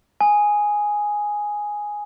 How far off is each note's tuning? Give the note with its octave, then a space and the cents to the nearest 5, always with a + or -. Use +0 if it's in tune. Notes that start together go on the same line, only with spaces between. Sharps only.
G#5 +0 D#6 +0